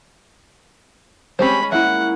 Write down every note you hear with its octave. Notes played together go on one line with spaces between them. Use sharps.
G#3 C4 C#4 G4 C5 B5
A#3 C#4 E4 E5 F#5